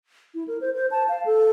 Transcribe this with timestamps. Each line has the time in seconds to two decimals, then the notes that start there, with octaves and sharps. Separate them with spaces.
0.35 E4
0.48 A#4
0.61 C5
0.74 C5
0.91 A5
1.09 F5
1.26 A4